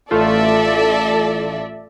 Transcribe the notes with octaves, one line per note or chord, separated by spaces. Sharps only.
A1 A3 F4 A4 D5 E5